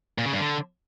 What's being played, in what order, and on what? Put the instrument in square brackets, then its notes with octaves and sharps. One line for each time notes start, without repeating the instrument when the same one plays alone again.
[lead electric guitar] A#2
C#3
G2
D3